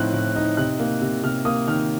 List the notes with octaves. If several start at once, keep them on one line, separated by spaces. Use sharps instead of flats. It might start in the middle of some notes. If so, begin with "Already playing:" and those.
Already playing: A2 F3 C4 D#4 F#6
A2
D#4
C3 F#6
A#3
C3
C3 F6
A#3 D#6
D#3 F6